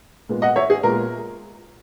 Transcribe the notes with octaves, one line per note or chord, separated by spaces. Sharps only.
A#2 G#3 B3
D#5 F#5
C#5 E5
G#4
A#2 G#3 B3 A#4